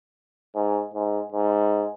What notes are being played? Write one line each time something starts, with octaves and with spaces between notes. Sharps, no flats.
G#2
G#2
G#2